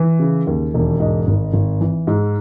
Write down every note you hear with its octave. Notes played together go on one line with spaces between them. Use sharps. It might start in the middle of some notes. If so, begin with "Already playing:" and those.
Already playing: E3
C#3
D#2
E1
G#2 D#5
G#1
G#1
E3
G#2